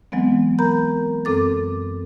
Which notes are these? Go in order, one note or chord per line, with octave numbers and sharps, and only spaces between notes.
E3 F#3 G#3 B3 C4
A#4 A#5 B5 G6
F#2 C4 A4 D6 A6